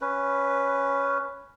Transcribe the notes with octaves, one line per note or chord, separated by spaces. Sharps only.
C#4 B4